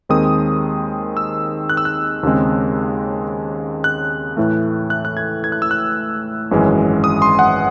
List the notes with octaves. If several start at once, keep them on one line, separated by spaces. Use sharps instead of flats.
D#2 D#3 G#3 C4 D#6
E6
F#6
E6
F#6
D#2 C#3 G#3 C4
F#6
A2 E3 A3
F#6
F#6
G#6
G#6
F#6
E6
F#6
G#1 F#2 E3 G#3 C#4
D#6
C6
F#5